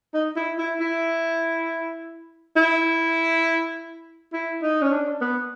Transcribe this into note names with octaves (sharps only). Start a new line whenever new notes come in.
D#4
E4
E4
E4
E4
E4
D#4
C#4
D4
B3